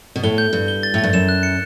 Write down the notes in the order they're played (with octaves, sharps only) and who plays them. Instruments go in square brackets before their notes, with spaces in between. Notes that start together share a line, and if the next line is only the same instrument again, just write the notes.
[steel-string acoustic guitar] B2
[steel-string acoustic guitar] A2 [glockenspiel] G7
[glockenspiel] G6
[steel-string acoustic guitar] G2 [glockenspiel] G6
[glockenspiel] G7
A6
[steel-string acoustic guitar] A2 [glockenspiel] A6
[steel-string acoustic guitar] G2
[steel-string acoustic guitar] F#2 [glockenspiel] E7
[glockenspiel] F#6
C#7